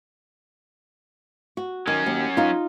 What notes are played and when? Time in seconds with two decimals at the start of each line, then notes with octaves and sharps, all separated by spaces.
1.57 F#4
1.87 D#3 F#3 C#4
2.06 D#2
2.37 D#4 F4